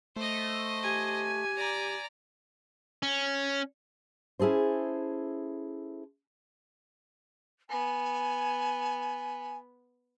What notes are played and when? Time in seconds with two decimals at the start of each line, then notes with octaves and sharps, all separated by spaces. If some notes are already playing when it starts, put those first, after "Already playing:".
0.16 A3 C5 D#5
0.83 G4 G#5
1.57 D5 A#5
3.03 C#4
4.40 C#4 E4 G#4 A4 C5
7.70 B3 G#5